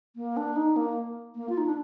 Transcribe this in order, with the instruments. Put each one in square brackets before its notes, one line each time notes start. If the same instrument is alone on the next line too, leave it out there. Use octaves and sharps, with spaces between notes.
[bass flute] A#3
D4
D#4
A#3
A#3
F4
D#4
D4